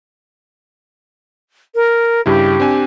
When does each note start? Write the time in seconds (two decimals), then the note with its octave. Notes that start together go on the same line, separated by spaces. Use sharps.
1.75 A#4
2.26 G2 C#3 E4 G4
2.60 C4 D4 G#5